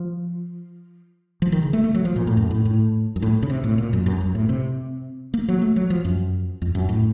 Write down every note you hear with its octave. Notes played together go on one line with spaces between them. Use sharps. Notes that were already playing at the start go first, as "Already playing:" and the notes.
Already playing: F3
F3
D#3
C#3
A3
A3
F#3
F3
A#2
A2
F#2
A2
A2
F#2
A2
C#3
C3
A2
A#2
F#2
F#2
F#2
A2
C3
A#3
F#3
A3
F#3
F3
F#2
F2
F#2
A2